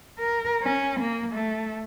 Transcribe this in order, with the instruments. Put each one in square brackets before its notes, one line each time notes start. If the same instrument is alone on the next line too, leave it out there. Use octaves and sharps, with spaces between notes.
[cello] A#4
C#4
A#3
A3